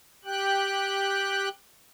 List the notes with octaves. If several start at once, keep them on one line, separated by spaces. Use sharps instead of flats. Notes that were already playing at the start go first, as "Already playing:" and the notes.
G4 G5 F#6